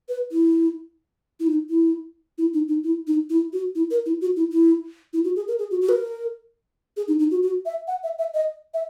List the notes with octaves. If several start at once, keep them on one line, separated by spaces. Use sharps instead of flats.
B4
E4
E4
D#4
E4
E4
D#4
D#4
E4
D#4
E4
F#4
E4
A#4
E4
F#4
E4
E4
E4
F#4
G#4
A#4
G#4
F#4
F#4
B4
A#4
G#4
D#4
D#4
F#4
F#4
E5
F#5
E5
E5
D#5
E5